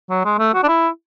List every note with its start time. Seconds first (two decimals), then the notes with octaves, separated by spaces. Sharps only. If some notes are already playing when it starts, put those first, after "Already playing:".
0.10 F#3
0.25 G#3
0.39 A3
0.54 F#4
0.64 D4
0.68 E4